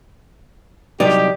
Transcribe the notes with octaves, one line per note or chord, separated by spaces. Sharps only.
C2 F#3 D#4 G4 D5